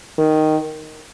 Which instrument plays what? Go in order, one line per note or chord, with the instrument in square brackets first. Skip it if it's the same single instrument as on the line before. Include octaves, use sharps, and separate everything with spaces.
[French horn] D#3